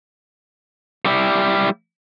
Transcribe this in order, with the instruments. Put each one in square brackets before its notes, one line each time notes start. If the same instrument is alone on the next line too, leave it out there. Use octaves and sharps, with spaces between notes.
[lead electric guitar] G3 E4